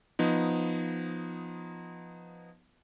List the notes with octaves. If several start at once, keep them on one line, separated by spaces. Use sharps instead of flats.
F3 B3 D#4